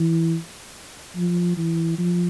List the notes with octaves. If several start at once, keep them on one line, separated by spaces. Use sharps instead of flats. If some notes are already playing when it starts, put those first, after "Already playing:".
Already playing: E3
F3
E3
F3